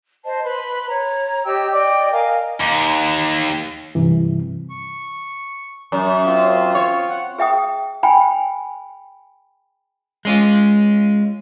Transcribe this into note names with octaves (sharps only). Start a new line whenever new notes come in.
C5 D#5 A5
B4 B5 C6
C#5 A#5
G4 D#5 G5 E6
D5 D#5 G5 D6
A#4 D#5 F5 G#5
D#2
G2 C3 E3
C#6
F#2
C4 F4
C#5
F#5
G#4 E5 G5 D#6
G5 G#5 B5
G#3 C#4 F4